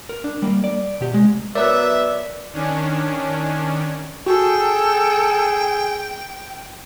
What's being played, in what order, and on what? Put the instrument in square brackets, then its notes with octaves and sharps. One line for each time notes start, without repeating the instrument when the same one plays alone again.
[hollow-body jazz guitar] A#4
D4
G3 A#3
D5
B2 G4
C2 G#3
[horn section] F#3 B3 E5 [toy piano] A#4 C#5 A#5 [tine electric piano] D5
[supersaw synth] D#3 C#4 D4
[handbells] F#4 [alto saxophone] G#4 [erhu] A4 [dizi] G5